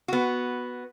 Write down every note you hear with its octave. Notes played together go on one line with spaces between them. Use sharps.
B3 F#4